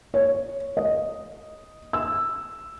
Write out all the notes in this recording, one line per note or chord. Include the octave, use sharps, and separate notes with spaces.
C#5
D#5
E6